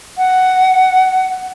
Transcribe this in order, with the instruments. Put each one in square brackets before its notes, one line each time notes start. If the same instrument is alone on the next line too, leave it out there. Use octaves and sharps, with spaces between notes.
[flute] F#5